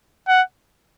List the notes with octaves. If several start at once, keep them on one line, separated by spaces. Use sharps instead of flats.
F#5